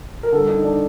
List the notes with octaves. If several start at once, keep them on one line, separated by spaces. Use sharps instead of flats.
A#4
D3 G3 A4
D#4
D4